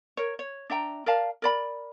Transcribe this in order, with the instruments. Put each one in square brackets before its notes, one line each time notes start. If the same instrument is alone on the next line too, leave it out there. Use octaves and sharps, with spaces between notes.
[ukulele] A#4 C#5
C#5
D4 E5 G5 A#5
A#4 D5 F5 A5
A#4 D5 B5